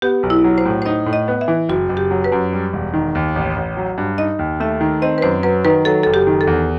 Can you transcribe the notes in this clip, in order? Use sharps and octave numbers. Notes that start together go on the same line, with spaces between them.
B3 G4
B1
E4
F#3
C5
A2
C5
D#4 D#5
A2
D#5
B3
E5
E3
F#1 F#4
F#1
G4
F#3
B4
F#2
G3
E1
D#3
D#2
A1
A1
F#3
G2
D#4 D#5
D#2
A3 E5
D#3
C4 D#5
B4
F#2 C5
F#3 B4
D#3 B4
F#3 A4
F#1 A4
G4
D#3
A4
E2